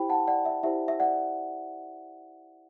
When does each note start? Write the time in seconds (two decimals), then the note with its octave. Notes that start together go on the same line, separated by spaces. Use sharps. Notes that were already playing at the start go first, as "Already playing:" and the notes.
Already playing: E4 G4 C5 G5 B5
0.10 F#5 A5
0.28 D5 F#5
0.45 E5
0.63 E4 G4 C5 E5
0.88 E5
1.00 D5 F#5